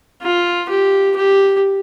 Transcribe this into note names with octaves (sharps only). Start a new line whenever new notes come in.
F4
G4
G4